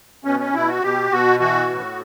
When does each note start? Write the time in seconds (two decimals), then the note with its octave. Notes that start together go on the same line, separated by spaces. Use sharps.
0.24 B2 C#4
0.40 C#4
0.54 B2 E4
0.68 F#4
0.83 B2 G4
1.11 B2 F#4
1.40 E3 F#4
1.69 A2